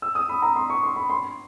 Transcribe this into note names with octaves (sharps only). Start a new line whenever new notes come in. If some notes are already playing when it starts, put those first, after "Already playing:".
E6
D#6
B5
A#5
C6
C#6
C6
B5
C6